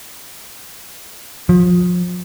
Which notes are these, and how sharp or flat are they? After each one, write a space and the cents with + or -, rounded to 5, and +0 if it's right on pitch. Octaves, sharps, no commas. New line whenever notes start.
F3 +35